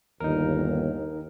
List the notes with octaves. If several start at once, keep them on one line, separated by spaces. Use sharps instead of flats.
G1 D#2 D#4 A#4